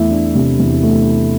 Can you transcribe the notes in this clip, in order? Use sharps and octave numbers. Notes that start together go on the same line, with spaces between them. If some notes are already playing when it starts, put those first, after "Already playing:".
Already playing: E2 A3 E4
D4
C3
E2
A3